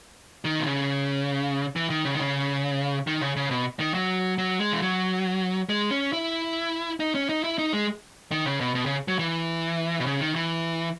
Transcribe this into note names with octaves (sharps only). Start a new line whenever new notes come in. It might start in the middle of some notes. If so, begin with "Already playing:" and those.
D#3
B2
C#3
E3
D#3
C#3
D#3
C#3
D#3
C#3
C#3
B2
D#3
F#3
F#3
G#3
E3
F#3
G#3
C#4
E4
D#4
C#4
D#4
E4
D#4
G#3
D#3
C#3
B2
B2
C#3
F#3
E3
B2
C#3
D#3
E3